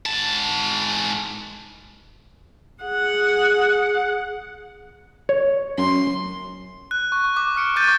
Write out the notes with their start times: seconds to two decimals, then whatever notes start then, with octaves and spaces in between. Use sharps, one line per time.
0.06 G#2 A5
2.84 G#4 F#5
5.29 C#5
5.78 F#2 C6
6.91 F#6
7.12 C#6
7.37 D6
7.55 D6 F6 C#7 D7
7.76 C#6 D6 F#6 G6 A6 D#7